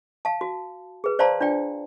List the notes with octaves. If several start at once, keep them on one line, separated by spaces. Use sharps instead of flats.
F5 A5
F#4
G#4 B4
C5 D5 F5 A5 A#5 C6
D4 F4 D5 G5